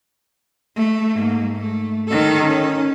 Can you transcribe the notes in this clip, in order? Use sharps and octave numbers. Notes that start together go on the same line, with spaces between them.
A3
G#2 A#3
A3
D#3 A4
C#4